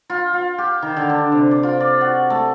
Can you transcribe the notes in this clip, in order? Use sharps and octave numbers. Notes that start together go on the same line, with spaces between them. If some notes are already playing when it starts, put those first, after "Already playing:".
F4
F4
G4
D#3
D3
D4
C3
D5
F4
D5
F#4
A3